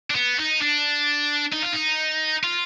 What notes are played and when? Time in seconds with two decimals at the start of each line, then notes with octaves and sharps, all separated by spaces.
0.10 D4
0.15 B3
0.39 D#4
0.62 D4
1.53 D#4
1.63 F4
1.73 D#4
2.44 F4